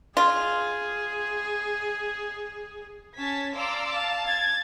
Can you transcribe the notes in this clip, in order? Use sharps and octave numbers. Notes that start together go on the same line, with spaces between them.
F4 G#4
C#4 A5 G#6 B6
D5 F5 A#5 C6 D6 E6
F5 A5
G#6 A6